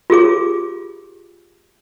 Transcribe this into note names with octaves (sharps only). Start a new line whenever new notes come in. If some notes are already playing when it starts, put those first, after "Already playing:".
F4 G4 G#4 D6